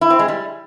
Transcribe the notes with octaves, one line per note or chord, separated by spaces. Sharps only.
E4
C4
G#3
G3